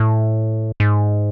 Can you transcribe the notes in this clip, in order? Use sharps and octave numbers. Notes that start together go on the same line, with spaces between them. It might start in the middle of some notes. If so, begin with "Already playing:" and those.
Already playing: A2
G#2